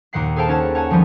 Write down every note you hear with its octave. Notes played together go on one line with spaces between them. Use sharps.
D#2 A#2 D#3 F#5 C7
G#4 A4 C5 F5 G5 A5
C#4 D#4 C#5 F#5 A5
C#5 F#5 G#5 A5
D#3 F3 G3 D#4